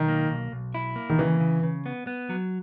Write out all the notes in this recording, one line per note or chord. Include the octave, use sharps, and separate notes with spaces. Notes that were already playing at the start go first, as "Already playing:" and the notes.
Already playing: B1 D#3
A#3
B1
B1
E4
A#3
D#3
C#3 E3
C#3
C#3
B3
B3
F#3